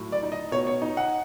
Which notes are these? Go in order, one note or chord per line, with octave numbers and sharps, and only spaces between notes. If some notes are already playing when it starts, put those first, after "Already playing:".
Already playing: A2 F#3
D5
D#4
D#5
B2 C#5
C#5
D#4
F#5